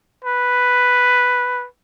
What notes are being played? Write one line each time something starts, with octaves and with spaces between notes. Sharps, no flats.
B4